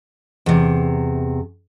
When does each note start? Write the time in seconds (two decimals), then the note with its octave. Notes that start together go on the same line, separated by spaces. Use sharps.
0.46 E2 C3